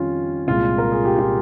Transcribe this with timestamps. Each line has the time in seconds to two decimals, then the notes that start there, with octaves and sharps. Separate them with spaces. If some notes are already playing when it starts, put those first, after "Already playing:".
Already playing: F2 D#3 G3 C#4 F4
0.47 C2 A#2 G#3 F4
0.78 A#4
0.92 G#4
1.05 G4
1.18 F4